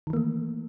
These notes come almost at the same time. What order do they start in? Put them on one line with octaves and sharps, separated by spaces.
D#3 E3 A#3 A3